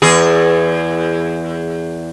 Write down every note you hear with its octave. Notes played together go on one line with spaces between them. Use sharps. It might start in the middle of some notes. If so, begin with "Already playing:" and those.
E2 G#4